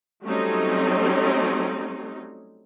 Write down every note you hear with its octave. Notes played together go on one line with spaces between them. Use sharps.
F#3 G3 A3 C4 C#4 D#4